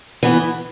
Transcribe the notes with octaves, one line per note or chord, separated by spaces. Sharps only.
E3 B3